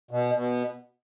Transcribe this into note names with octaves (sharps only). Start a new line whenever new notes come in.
B2
B2